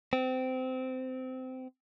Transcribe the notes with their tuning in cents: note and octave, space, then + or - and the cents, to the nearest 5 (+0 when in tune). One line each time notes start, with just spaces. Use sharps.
C4 -20